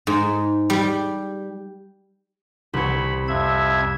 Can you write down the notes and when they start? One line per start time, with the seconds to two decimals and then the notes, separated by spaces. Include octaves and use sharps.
0.07 G#2
0.70 G3
2.74 C2 C#5 B5
3.28 F2 E5 G#6